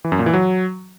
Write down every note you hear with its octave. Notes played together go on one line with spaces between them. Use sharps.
E3
F#2
A#2
E3
F#3